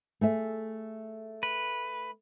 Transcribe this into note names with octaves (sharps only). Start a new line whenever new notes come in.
A3 G#4 E5
B4